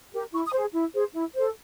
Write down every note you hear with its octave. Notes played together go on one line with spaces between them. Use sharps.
G4 A#4
E4 C#6
D#6
G#4 C5
E4
G#4 C5
E4
A4 C5